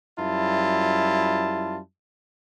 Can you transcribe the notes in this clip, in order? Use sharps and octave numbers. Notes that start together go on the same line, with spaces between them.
F#2 G3 E4 F4 A5